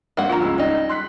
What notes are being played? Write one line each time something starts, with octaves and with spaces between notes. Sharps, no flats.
G2 A#3 C4 F#5
D2 F3 F4 A#5
C#2 G#4 E6
G3 D#4
C6 F#6 B6